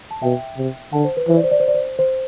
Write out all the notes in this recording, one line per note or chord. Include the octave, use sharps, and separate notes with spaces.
A5
B2 E5 G5
C3
D3 F#5 A5
C5
B4
E3 C5
D5
C5
D5
C5
D5
C5
C5